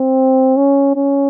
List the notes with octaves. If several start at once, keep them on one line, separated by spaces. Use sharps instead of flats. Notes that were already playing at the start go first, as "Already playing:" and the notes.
Already playing: C4
C#4
C#4